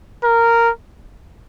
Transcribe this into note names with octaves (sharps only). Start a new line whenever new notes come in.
A#4